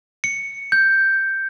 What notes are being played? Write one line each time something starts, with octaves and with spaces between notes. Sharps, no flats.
C#7
G6